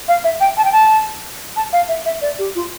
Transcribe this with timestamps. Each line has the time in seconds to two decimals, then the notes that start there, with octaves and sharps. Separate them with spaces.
0.08 F5
0.24 E5
0.40 G5
0.57 A5
0.65 G5
0.72 A5
1.56 A5
1.73 F5
1.88 E5
2.05 E5
2.21 D5
2.39 G4
2.55 F4